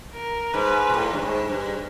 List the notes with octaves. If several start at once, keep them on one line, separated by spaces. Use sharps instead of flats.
A#4
G#2 B4
A#2
A2
G2
G#2
G2